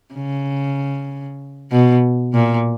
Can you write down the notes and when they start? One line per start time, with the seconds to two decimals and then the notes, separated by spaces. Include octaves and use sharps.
0.15 C#3
1.72 B2
2.34 A#2